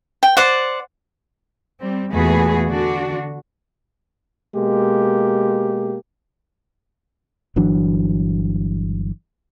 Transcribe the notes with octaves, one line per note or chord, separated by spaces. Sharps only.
G5
C5 D5 F#5
G3 C4
E2 A#2 A3 F#4 G#4 B4
D3 D4 F#4
B2 G#3 A#3 G4
G1 E3 F#3 D4